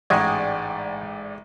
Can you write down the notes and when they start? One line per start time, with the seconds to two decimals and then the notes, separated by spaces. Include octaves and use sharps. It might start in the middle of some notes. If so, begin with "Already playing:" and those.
0.10 A1 G#2 G#3 D5 F#5 G5 C#6 G#6